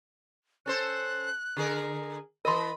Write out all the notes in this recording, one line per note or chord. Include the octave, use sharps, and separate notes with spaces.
C#4 A4 C5 F#6
D3 G#4 A#4
E3 A#4 D#5 B5 C6